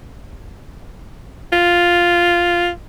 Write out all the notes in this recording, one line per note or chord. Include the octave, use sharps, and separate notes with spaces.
F4